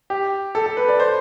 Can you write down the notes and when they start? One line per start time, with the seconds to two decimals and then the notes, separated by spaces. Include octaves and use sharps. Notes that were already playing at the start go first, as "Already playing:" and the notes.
0.10 G4
0.55 A4
0.66 A4
0.77 B4
0.89 D5
1.00 C5